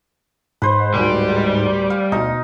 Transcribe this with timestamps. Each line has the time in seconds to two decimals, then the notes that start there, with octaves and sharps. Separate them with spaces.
0.62 G#2 B4 C5
0.94 D1 F#3 G3 G#5
1.90 F5
2.12 D2 B2 D#4